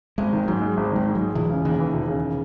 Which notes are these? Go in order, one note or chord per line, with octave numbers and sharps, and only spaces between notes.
G#1 G#3
D#3
G#2 F#3
G#3
G#1
D#3 G#3
G#2
F#3
G#3
E1 E3
C#3
D#2 D#3
E3
E1
C#3